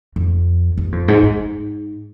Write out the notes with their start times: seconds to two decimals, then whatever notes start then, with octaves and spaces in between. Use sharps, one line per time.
0.16 F2
0.78 G2
0.92 F2
1.08 G#2
1.23 G#2